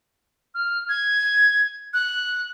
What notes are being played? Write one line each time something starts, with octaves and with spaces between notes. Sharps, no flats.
F6
G#6
F#6